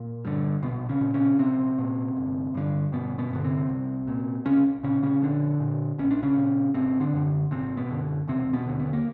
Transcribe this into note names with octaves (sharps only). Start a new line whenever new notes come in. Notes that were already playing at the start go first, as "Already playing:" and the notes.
Already playing: A#2 A#3
G2 D3
A#1 B2 B3
C#3 C#4
A#2
C#3 C#4
A#1 C3 C4
A#2
G1
G2 D3
G1 B2 B3
B2 B3
G2 D3 B3
C3 C4
C2
A#2
C2 C#3 C#4
A#2 C#3 C#4
C#3 C#4
A#1 D3 D4
A#2
A#1 C#4
D4
C#3 C#4
A#2
G#1 C3 C4
D3 D4
F#2 D3
G#1 C3 C4
B2 B3
F#2 D3
E1 C3 C4
B2 B3
D#2 D3
B3
A#3